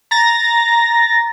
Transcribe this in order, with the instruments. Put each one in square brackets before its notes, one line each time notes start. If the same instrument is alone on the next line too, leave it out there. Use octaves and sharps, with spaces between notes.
[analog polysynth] A#5 A6 A#6